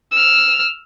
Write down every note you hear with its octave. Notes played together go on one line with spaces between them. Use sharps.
E6 F6